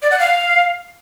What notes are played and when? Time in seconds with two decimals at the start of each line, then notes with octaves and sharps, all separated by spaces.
0.02 D5
0.11 F#5
0.20 F5